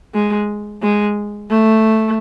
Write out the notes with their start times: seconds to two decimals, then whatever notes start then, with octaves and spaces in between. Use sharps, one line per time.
0.14 G#3
0.82 G#3
1.50 A3